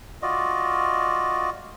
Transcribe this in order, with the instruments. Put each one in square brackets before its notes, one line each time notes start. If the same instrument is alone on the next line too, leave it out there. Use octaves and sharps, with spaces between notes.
[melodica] F4 F#4 D5 D#5